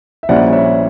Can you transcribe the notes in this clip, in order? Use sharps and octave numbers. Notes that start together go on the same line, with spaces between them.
E5
A#1 A#2 G3 C#4 E4 D5 F#5
C#5 E5